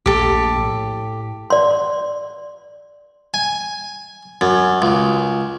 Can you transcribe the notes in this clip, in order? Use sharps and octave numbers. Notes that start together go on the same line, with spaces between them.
A#1 A3 G4 A4
A2
D5 C6
G#5
F#2
C#2